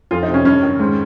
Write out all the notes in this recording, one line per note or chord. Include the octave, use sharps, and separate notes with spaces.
F2 F4
D#4
C3
C#4
G2 C#4
D#3
G#2